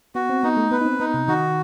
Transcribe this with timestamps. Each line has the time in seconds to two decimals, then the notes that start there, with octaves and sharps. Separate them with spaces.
0.15 B3 F#4
0.29 C4
0.43 B3 D#4
0.57 A3
0.71 B3 B4
0.81 D#4
0.86 C4
1.00 B3 D#4
1.14 C3
1.28 D#3 F#4